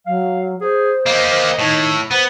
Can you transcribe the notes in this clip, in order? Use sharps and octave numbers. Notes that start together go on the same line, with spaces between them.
F#3 F5
G#4 C5
A#3 G4 D#5
A2 D#3
B3 C5